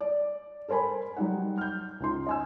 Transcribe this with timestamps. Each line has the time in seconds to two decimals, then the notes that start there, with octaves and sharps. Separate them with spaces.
0.01 D5
0.68 A4 A#4 C5 G#5 B5
1.16 F#3 G3 D#4 F#5
1.58 F6 G6
2.00 C#2 D#4 C6
2.27 D#5 G#5 E6